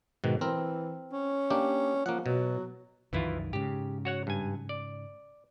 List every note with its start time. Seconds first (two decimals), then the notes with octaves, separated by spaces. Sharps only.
0.24 G#2 B2 D#3
0.41 E3 C4 A#4
1.12 C#4
1.50 A#3 D4 G4
2.06 F3 A#3 F#5
2.26 B2 F#3
3.13 C2 F#2 D#3 E3 E4 F4
3.53 G#2 C#3 G4
4.05 F#4 C#5 F#5
4.27 G2 G#5
4.69 D5